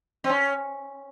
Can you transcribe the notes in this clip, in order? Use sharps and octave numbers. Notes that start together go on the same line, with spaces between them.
C4
C#4